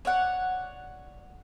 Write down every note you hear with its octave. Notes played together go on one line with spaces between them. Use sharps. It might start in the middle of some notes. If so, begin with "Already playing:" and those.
C#5 D5 F#5